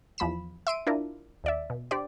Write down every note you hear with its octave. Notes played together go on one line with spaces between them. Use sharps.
E2 F3 B5 B6 E7
E5 C6 D7 D#7
D4 E4 F4 A#4
D#2 D5 E5
B2
D4 G4 C5 D5